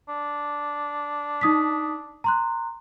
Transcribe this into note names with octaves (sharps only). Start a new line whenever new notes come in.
D4
D#4 D#6 B6
A#5 C6 F#6